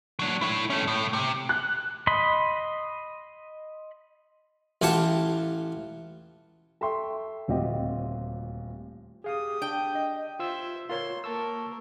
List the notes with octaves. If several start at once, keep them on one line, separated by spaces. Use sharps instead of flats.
F#3 D4
E4 C#5
A3 C#4
A2
C3
F#6
D#5 B5 C6
A1 E3 F4 G4 F#5 A5
A4 E5 G5 C6 C#6
D#1 D2 C4 F4 G4 D#5
G4 G#4 F5 D#6
D4 G5
D#5
F4 C5 E5 E6
F4 A#4 C#5 C6
A#3 A#4 A5 C#6 E6